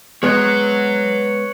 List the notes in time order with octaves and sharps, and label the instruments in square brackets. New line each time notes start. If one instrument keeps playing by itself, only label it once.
[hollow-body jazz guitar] G#3 B3 [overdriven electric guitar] C#5 F#5